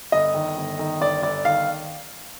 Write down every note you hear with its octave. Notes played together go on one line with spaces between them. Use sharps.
G1 D#5
D#3
G1
D#3
G1 D5
G1 D5
D#3 F5